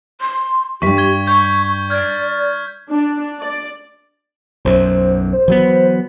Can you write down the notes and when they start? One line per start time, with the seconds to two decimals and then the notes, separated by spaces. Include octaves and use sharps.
0.21 C6
0.82 E2 G2 G4 C#6 B6
0.97 C#6 G#6 G7
1.27 C#6 G6
1.90 D5 F6 G6 G#6
2.90 D4
3.40 D5
4.65 B1 F#2 C5
5.33 C5
5.48 E3 F#3 B3